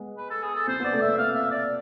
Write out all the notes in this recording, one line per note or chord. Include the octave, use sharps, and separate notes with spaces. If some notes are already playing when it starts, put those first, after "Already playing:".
Already playing: G#3 B3
B4
A4
G#4
A4
C4 C5
B3 D5
A3 C4
E5
F5
E5
D5